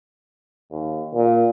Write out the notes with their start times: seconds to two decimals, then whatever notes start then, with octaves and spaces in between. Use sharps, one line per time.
0.72 D#2
1.15 A#2